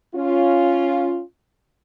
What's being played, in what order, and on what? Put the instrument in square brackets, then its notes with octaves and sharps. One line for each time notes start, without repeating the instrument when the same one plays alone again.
[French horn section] C#4 F4